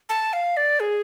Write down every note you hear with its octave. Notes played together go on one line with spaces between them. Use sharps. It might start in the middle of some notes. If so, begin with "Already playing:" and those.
A5
F5
D5
G#4